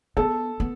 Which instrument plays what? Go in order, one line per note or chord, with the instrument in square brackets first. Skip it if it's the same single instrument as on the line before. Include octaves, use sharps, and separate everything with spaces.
[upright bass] B3 [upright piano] A4
[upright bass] B3